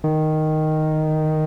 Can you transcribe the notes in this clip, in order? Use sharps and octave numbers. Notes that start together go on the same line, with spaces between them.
D#3